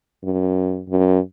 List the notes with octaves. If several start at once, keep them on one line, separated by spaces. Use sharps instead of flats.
F#2
F#2